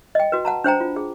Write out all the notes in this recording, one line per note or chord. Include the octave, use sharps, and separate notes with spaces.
D#5 G5
F#4 B4
F#5 A5 A#5
D4 C5 G5 A#5
F4
G#4